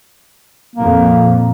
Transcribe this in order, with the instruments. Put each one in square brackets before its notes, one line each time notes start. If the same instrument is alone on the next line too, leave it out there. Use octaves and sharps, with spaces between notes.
[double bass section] F2 A#2 [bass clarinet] A#3